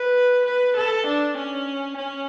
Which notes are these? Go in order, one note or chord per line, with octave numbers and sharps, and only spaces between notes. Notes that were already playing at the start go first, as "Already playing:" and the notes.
Already playing: B4
B4
A4
D4
C#4
C#4